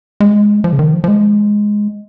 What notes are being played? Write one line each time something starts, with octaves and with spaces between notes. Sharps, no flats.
G#3
F3
C#3
D#3
F3
F3
G#3